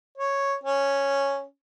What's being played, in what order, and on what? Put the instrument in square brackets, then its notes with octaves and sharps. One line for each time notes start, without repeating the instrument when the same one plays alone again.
[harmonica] C#5
C#4